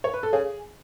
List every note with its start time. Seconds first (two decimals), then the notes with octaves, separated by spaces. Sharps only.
0.04 C#5
0.14 B4
0.23 A4
0.32 C#3 G#4